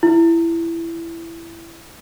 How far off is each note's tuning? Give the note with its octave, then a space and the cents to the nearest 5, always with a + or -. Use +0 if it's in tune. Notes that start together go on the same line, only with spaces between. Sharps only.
E4 +15